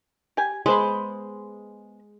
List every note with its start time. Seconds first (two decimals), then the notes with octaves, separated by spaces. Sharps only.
0.37 G4 G#5
0.66 G#3 B3 C5 B5